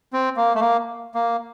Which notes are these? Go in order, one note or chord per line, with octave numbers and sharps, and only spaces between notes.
C4
A#3
A3
A#3
A#3